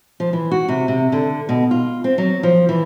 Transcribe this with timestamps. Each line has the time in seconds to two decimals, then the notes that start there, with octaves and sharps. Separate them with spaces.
0.20 F3
0.33 E3
0.51 F#4
0.68 C3
0.88 C3
1.12 D3
1.49 B2
1.71 F4
2.04 C4
2.18 F#3
2.43 F3
2.69 E3